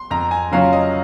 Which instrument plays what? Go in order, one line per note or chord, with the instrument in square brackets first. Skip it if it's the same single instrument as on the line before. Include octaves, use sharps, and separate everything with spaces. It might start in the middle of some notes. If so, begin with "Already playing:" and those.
Already playing: [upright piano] C6
[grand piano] F2 [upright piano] A#5
[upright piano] G#5
[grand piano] C#3 F#3 C#4 F4 [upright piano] F5
[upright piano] D#5